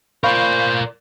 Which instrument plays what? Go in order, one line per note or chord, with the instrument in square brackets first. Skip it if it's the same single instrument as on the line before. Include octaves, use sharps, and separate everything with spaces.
[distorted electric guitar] A#4 D5 [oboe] C5 [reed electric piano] F5 B5 C#6